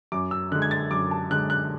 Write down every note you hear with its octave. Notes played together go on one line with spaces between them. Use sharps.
F#2 D6
E6
D3 G#3 F#6
G#6
A6
F#2 D6
A5
D3 G#3 F#6
F#6